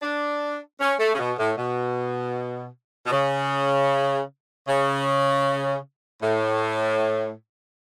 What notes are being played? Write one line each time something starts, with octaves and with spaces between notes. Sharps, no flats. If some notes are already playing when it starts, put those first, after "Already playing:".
D4
C#4
A3
C#3
B2
A2
B2
B2
C#3
C#3
A2